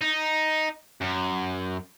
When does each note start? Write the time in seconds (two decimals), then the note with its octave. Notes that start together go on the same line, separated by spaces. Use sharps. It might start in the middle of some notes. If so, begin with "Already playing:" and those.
0.01 D#4
1.01 F#2